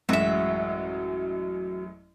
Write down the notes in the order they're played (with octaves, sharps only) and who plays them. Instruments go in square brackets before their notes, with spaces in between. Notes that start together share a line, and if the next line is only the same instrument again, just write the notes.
[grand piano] A1 F#2 G#3 [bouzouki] F#4 E5